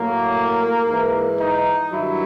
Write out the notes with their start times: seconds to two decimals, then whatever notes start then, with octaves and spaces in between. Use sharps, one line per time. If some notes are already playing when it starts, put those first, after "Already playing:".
Already playing: A2 F#3 A#3
0.86 G#2 E3
1.39 D#4
1.92 G2 D#3 F#3 E4